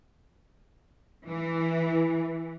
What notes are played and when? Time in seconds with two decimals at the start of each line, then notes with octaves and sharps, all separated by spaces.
1.27 E3